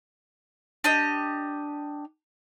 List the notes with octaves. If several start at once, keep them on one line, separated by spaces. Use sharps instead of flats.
D4 G4 D#5